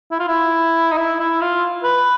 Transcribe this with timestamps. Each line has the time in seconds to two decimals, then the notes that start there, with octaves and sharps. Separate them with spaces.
0.11 E4
0.19 F4
0.28 E4
0.92 D#4
0.97 E4
1.20 E4
1.41 F4
1.83 B4